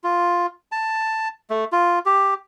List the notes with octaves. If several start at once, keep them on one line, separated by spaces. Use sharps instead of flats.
F4
A5
A3
F4
G4